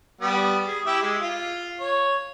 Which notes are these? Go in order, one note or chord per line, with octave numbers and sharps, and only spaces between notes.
G3 B3
G#4
E4 G4 E5
G#3
F4
C#5